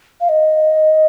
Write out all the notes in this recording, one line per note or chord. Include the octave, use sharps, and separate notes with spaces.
F5
D#5